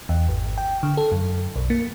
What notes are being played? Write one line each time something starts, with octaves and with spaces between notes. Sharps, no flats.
E2
G#1
G5
D3
A4
F#2
B1
A#3